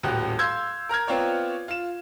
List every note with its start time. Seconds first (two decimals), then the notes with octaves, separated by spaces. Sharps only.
0.03 D#1 A1 F#4 G4 F#6
0.39 F5 C6 E6 G6 G#6
0.89 A#4 A#5 F6 G#6
1.07 B3 C4 F4 C#5 D5
1.68 F4 E7